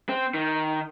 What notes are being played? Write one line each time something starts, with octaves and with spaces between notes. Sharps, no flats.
C4
D#3